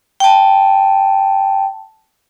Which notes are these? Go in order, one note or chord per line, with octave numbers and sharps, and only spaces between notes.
G5 A5